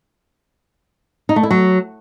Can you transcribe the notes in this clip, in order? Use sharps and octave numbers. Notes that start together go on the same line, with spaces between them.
D#4
A3
E4
F#3